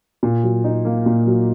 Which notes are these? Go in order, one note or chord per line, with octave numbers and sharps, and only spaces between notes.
A#2
F#3
D#4
A#3
A#2
F#3